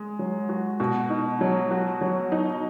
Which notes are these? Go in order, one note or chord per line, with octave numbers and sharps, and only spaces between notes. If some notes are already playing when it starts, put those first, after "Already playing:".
Already playing: G#3
F#3
F#4
B2 F#4
D#4
F#3
F#4
F#3
D#4